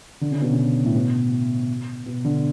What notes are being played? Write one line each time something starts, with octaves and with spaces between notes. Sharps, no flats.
D3
C#3
B2
C#3
A2
B2
B2
D3